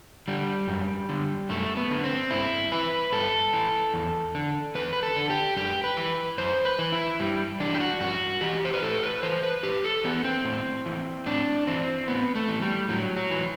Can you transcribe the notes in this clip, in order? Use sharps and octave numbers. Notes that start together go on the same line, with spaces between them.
D3 G3
F#2
D3
F#2 A3
B3
D3
C4
G2 E4
E3 B4
G2 A4
E3
E2
D3
E2 B4
B4
A4
D3
G4
F#2 G4
B4
E3
F#2 C5
B4
E3
E4
G2 G3
E3 D4
G4
F#4
G2 F#4
E3 G4
C5
B4
A2 A4
B4
E3 C5
B4
A2 G4
A4
E3 B3
C4
A2
E3
A2 D4
E3 C4
A2 B3
A3
E3
G3
A2 F#3
F#3
E3